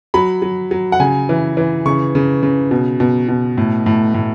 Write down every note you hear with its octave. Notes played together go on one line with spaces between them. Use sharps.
F#3 B5
F#3
F#3
F#5
C#3 G#5
E3
E3
C#3 C#6
C#3
C#3
B2
B2
B2
A2
A2
A2